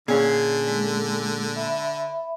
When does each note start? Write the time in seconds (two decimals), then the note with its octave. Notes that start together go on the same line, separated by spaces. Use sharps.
0.08 A#2 D3 C#4 G#4
0.68 G#3 A4
1.56 E5 B5